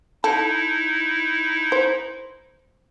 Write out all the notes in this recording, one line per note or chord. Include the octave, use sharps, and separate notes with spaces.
D#4 E4 A4
C5